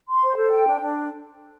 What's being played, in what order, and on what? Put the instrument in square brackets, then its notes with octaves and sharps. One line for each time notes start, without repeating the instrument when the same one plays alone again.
[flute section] C6
C5
A4
G5
D4
D4